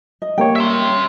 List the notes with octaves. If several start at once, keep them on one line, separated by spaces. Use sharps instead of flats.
D#5
G3 A#3 C#5 G5
E5 C6